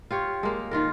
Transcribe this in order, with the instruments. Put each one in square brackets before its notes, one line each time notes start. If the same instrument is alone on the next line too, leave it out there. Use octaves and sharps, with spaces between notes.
[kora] F4 G4 C#5
G#3 A#3
D#3 F4 A#4